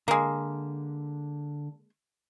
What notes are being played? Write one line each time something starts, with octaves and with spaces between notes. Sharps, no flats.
D3 G#3 A#3